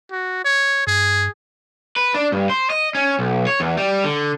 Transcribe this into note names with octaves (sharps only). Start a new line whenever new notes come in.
F#4
C#5
G2 G#4
B4
D4
G2
C5
D#5
C#4
B1
C#5
E2
G3
D3